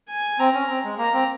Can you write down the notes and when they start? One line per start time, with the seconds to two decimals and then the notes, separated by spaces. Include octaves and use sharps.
0.09 G#5
0.39 C4 A#5
0.54 C#4
0.69 C4
0.84 G#3
0.98 A#3 A#5
1.13 C4